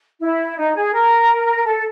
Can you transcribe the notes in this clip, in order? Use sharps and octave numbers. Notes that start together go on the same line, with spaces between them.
E4
D#4
G#4
A#4
A4